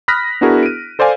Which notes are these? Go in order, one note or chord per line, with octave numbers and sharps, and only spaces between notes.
B5 D#6 F6 F#6 A#6 B6
B3 D4 E4 F#4 G#4 A#4
D7 D#7
A4 C5 D5 F5 G#5